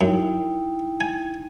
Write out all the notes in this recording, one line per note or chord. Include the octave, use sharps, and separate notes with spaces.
F#2 D#4 E4 G5
G#5